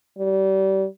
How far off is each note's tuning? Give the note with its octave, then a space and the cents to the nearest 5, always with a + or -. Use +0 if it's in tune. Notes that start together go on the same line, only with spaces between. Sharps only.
G3 -30